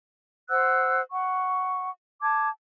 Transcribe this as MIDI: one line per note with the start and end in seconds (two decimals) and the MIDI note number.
0.50 1.01 72
0.50 1.01 78
0.50 1.01 88
0.50 1.01 90
1.12 1.90 78
1.12 1.90 85
2.23 2.49 81
2.23 2.49 86
2.23 2.49 92